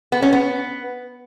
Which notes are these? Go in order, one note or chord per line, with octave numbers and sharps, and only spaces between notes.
B3
C#4
B3